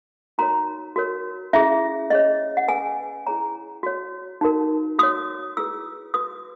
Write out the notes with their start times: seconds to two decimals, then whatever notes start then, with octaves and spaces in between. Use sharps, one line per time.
0.38 D#4 F#4 A#4 C#5 A#5
0.96 F#4 A#4 C#5
1.53 C#4 E4 G#4 E5
2.10 C#4 G#4 C#5 D#5
2.57 F#5
2.68 C#4 G#4 B4 G#5
3.27 E4 G#4 C#5 A#5
3.83 F#4 C#5
4.41 D#4 F#4 A#4
4.99 F#4 C#5 D#6
5.57 E4 G#4 B4 E6
6.14 F#4 B4 D#6